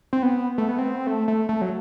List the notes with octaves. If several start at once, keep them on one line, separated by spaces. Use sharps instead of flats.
C4
B3
A3
B3
C4
A3
A3
A3
F#3